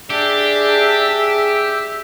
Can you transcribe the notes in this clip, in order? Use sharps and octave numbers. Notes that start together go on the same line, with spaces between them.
D4 G4 G#4 E5